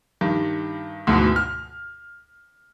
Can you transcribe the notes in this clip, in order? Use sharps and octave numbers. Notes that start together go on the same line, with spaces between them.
G2 D#3
D2 G#2 B2 E3
F6